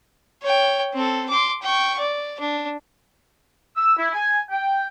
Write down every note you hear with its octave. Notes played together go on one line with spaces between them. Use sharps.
C#5 G5
C4 A4
C6 D6
G5 C#6
D5
D4
E6
E4
G#5
G5